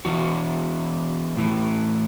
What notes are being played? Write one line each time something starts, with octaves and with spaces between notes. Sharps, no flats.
E2 E3 F#4
A2 E3